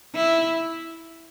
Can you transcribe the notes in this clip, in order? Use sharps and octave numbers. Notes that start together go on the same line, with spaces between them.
E4